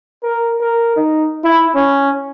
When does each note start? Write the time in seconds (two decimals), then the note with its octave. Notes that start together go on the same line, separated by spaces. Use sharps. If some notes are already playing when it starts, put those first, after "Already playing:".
0.23 A#4
0.61 A#4
0.96 D#4
1.44 E4
1.75 C#4